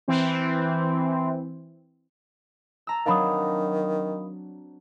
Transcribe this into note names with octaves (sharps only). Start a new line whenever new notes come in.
E3 C4
A5 A#5 E6
D#3 F#3 C4 D4 F5 B5 D#6